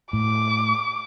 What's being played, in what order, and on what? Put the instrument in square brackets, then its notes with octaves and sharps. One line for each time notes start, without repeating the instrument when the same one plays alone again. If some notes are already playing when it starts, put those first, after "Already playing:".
[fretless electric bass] A2 [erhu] D6